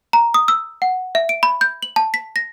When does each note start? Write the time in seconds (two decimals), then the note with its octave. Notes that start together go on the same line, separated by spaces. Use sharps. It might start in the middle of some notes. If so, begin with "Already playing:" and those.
0.13 A#5
0.34 D#6
0.48 E6
0.82 F#5
1.15 E5
1.29 D7
1.43 B5
1.61 G6
1.83 F#7
1.96 A5
2.14 B6
2.36 A#6